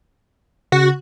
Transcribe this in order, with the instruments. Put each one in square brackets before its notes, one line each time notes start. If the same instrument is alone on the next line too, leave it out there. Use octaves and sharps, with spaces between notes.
[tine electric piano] C#3 [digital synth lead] F#4